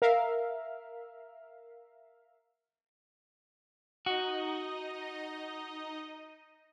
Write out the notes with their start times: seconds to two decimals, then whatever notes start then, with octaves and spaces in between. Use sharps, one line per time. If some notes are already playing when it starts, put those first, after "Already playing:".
0.02 A#4 E5 F5
4.06 D#4 F#4 D#5